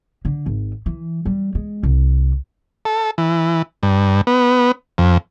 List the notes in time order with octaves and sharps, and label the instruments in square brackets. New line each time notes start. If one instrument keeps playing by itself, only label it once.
[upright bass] D3
G#1
E3
G3
G#3
C2
[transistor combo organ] A4
E3
G2
B3
F2